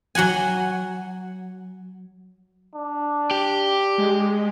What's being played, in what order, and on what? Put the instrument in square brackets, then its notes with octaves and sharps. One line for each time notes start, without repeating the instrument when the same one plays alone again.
[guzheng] F#3 F#4 F#5 G#5
[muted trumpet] D4
[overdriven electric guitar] G4
[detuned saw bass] G#3